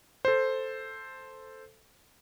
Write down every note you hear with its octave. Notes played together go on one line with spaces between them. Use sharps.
A4 C5